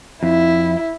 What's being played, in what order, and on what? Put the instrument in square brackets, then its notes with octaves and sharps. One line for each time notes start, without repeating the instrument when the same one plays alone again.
[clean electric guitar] F2 [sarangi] E4